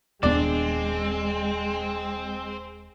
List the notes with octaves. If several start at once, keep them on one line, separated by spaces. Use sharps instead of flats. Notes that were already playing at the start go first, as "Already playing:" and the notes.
D#1 G#3 B3 C4 D4 D5